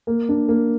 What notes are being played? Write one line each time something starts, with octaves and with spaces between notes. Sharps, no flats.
A#3
D4
A#3